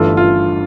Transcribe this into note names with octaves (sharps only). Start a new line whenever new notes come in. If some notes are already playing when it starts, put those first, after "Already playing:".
Already playing: G1 G2 E3 A3 F4 A4
F4